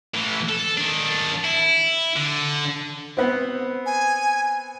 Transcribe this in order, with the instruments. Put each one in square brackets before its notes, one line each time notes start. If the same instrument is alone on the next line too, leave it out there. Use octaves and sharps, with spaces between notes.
[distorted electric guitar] A2 E3
A4
D#3 D4
E4
D3
[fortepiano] B3 C4
[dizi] G#5